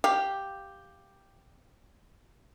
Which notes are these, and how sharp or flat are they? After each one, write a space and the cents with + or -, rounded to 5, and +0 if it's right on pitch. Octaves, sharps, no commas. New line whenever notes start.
G4 +0 F5 +0